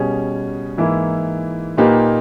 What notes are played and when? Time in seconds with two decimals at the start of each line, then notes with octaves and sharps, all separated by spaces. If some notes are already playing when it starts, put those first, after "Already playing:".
Already playing: B2 G3 C#4 G#4
0.77 G#2 E3 A#3 E4
1.78 A#2 A#3 D#4 G4 B4